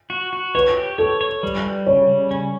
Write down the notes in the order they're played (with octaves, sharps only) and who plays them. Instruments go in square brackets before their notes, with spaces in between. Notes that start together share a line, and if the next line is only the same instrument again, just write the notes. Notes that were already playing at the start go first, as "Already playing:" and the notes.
[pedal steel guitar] F#4
F#4
[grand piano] B4 [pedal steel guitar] C#5
[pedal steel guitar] G4
[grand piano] A4 [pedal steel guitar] C#5
[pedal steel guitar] C#5
G3
G3
[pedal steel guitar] C#3 [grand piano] C#5
[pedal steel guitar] G3
C#4